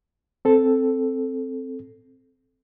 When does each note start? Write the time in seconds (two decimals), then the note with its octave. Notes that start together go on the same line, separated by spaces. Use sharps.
0.45 C4 A4